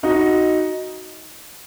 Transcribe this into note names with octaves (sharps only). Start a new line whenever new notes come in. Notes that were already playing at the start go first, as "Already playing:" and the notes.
D#4 F#4